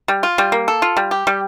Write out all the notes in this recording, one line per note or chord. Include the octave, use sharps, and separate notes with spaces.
G3
F4
G3
A#3
A4
F4
G3
G4
G3